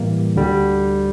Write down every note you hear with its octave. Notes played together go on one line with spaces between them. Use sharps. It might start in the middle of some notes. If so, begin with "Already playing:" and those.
Already playing: A2 E3 G3 A#3
D2 D3 G3